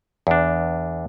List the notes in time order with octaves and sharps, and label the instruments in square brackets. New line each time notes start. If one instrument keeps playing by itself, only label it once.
[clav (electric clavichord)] E2 D4